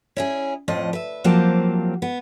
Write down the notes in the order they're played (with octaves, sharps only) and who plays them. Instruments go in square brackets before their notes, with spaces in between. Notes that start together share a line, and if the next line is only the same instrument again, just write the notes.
[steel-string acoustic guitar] C#4 E4 G#4
F2 A2 F3 D#5
B4 E5
F3 F#3 A#3 C4 G4 A5
B3